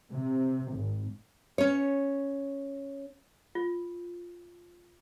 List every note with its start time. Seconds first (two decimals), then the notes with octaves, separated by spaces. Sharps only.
0.12 C3
0.73 G#1
1.58 C#4 C#5
3.55 F4